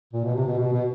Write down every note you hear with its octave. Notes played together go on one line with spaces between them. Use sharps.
A#2
B2
C3
B2
B2
B2